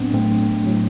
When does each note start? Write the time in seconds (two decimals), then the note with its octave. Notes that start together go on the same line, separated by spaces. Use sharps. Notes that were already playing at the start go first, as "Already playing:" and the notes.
Already playing: A2 F#3 B3 C4 D4
0.14 A2 F#3 A3 C4
0.66 A2 F#3